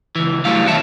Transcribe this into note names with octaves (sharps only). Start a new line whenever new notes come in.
C#2 E3
F#3 G3 A3 E4 F5
B1 D#3 B3 C#5 E5 A5